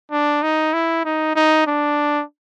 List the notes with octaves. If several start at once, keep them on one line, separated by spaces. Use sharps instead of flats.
D4
D#4
E4
D#4
D#4
D4